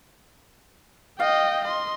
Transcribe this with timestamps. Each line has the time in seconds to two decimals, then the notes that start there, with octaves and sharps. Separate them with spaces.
1.20 D#5 F5 G5
1.65 D#5 C6